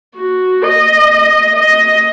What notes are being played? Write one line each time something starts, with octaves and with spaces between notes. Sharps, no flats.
F#4
D#5
D#5